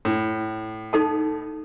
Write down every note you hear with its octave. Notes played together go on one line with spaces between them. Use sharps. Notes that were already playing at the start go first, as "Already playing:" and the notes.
A2
D#4 A4 A5